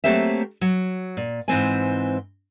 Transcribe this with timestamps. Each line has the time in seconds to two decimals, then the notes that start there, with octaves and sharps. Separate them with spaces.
0.04 F#3 A3 A#3 C4 G4 E5
0.61 F#3
1.17 A#2
1.48 G#2 E3 C4 G#5